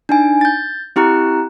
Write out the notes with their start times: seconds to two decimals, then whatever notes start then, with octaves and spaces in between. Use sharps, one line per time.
0.09 D4 D#4 G#5
0.41 G6 A6
0.96 C4 E4 G4 A#5 F#6